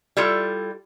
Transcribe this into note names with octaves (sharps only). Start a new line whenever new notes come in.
G3 E4 F4 A4